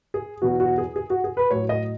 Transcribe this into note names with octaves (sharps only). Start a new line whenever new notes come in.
G#4
E2 B2 F#3 F#4
F#4
G#4
G#4
F#4
G#4
B4
A2 F#3 C#5
D#5